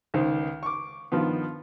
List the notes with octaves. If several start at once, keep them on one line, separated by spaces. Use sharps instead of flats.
C#2 D#3 C5
C#6 D6
G2 D#3 F3 B3